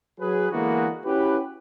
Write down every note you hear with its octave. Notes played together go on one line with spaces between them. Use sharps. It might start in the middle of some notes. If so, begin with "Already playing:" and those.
F#3 G#4 B4
D3 E3 G#3 A#3 B3 F#4
C#4 E4 F#4 G4 B4